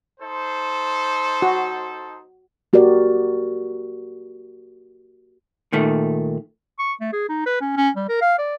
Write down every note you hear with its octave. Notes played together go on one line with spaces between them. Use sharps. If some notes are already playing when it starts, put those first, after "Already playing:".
D#4 A4 C5
F#4
A#3 F#4 G4 A#4 D5
A#2 D#3 A3
C#6
A3
G#4
D#4
B4
C#4
C#4
G3
A#4
F5
D5